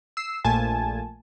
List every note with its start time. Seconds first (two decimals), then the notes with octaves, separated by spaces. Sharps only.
0.17 E6 C7
0.45 A#1 A#2 A3 G#5 A5